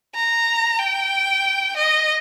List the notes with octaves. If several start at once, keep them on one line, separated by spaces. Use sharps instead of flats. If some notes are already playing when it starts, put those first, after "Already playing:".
A#5
G5
D#5